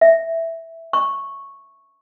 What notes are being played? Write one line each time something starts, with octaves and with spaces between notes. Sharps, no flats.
E5
C#6